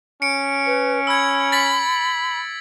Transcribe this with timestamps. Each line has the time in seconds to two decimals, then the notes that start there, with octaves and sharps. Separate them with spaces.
0.22 C#4 C#7 D7
0.66 B4
1.07 B5 E6 G#6
1.52 A6 B6 F#7